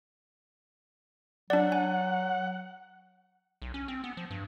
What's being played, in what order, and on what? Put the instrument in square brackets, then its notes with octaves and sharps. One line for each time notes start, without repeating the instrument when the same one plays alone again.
[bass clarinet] F#3 [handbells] D4 D5 [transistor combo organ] F#5
[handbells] G#5
[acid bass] B1
C#4
C4
B3
F3
G2